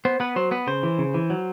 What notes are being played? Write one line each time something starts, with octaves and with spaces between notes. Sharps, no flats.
B3 C5
B3 B4
F#3 C5
B3 B4
C#3 C5
E3
C#3
E3
F#3